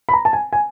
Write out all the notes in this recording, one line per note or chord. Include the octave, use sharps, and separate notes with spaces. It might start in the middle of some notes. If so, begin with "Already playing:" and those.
B5
A#5
A5
G#5
G#5